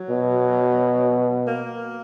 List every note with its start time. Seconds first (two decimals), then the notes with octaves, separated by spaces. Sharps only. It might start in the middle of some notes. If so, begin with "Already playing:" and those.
Already playing: F#3
0.09 B2
1.48 A#3